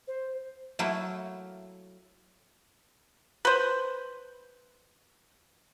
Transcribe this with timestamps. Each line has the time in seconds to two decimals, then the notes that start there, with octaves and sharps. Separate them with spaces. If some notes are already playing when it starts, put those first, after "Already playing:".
0.07 C5
0.79 F#3 A3 A#3 E4
3.45 B4 C5